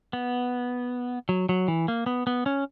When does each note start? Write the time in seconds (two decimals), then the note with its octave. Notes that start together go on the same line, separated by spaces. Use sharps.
0.13 B3
1.29 F#3
1.49 F#3
1.68 E3
1.88 A#3
2.06 B3
2.27 B3
2.46 C#4